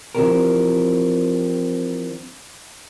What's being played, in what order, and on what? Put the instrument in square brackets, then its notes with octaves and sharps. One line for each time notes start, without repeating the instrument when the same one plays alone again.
[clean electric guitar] E3 F3 C4 D4 G4 A#4